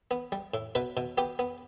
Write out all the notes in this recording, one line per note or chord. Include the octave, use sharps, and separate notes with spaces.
B3
G3
A2
B2 B4
B2
B3 G4
B3